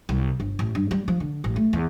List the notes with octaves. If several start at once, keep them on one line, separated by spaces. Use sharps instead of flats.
C2
G1
A1
G2
G3
F3
D3
A1
A3
E2